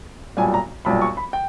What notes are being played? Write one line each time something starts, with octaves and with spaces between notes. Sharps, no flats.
B1 A#2 G3 G#5
A#5
B1 A#2 G3 B5
C#6
B5
G5